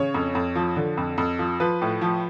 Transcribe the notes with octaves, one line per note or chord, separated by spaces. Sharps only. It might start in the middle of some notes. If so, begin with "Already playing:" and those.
Already playing: C#3 C#5
F2
F2
F3
D3
F2
F2
F3
F3 B4
A2
F3